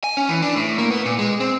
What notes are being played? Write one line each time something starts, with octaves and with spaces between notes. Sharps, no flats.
G#5
C#4
E3
D4
A2
A#3
B3
A#2
G#3
C4